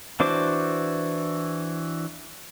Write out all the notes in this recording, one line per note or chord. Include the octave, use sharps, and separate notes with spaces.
E3 D4 F#4 C5 D6